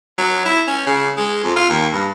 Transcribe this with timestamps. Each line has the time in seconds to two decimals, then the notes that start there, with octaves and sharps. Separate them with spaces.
0.18 F#3
0.45 E4
0.67 C#4
0.86 C#3
1.17 G#3
1.44 F2
1.56 F4
1.69 D#2
1.92 G2